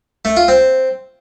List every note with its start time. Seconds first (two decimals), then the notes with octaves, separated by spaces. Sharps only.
0.25 A3
0.37 F4
0.48 C4